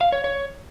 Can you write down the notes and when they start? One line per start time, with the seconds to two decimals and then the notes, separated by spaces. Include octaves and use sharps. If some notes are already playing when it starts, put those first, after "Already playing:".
0.01 F5
0.12 C#5
0.24 C#5